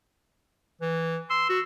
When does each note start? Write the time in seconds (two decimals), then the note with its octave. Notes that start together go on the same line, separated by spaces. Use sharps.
0.81 E3
1.30 C6 E6
1.49 F#4